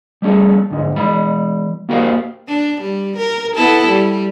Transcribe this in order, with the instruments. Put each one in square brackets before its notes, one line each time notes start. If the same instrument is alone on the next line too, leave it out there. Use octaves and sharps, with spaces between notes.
[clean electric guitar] G3 A3 C#4 G#4 A4
D2 G#2 D#4
E3 G#3 B5
A#3 F#4 G4 A#4 C5 F5
[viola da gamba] D4
G3
A#4
B3 E4 A4
G3